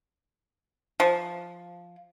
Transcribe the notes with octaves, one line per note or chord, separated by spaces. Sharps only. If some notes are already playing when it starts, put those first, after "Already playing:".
F3